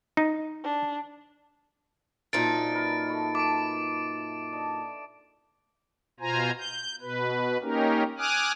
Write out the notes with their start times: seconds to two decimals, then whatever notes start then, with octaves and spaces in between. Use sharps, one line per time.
0.17 D#4
0.64 D4
2.33 F#2 A#2 D4 D#4 C5 D5 A6 D7
2.75 A#4 B4
3.08 A3 D#5 B5
3.35 A3 A5 D6 E6 D7
4.53 D4 D#5
6.20 B2 F4 C5 G#5 A#5
6.58 G6
7.01 B2 B4
7.62 A#3 C#4 D#4 G4 A#4
8.18 G#5 D6 D#6 F6 F#6